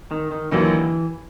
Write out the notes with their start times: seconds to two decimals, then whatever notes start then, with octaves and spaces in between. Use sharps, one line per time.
0.11 D#3
0.32 D#3
0.51 D#2 D3 E3 F#3 A#3 D#4